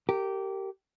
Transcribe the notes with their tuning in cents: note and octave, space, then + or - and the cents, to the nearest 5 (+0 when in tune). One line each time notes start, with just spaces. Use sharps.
G4 -15 A#4 -30